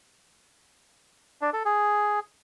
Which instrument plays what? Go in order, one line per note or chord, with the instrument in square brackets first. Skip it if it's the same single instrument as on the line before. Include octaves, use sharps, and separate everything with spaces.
[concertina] D4
A4
G#4